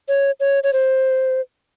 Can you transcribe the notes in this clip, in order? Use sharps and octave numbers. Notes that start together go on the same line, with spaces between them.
C#5
C#5
C#5
C5